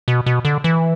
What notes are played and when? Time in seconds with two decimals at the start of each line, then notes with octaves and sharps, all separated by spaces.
0.08 B2
0.26 B2
0.45 D3
0.64 E3